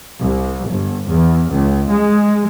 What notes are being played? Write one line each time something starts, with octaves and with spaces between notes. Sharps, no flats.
C2
G1
E2
C#2
G#3